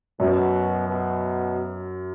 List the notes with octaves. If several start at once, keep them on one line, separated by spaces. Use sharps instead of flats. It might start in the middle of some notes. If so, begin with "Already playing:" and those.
F#2 B2
B2